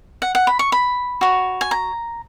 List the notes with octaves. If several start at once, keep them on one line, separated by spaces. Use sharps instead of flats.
F#5
F#5
B5
C#6
B5
F#4 C#5
G#5
A#5